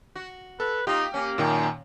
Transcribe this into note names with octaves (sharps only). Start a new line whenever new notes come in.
F#4
A4 B4
A#3 D#4 F4 G4
A#3 C#4
F#2 A#2 D#3 G5